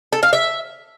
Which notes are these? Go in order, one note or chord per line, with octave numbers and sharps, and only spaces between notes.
A4
F5
E5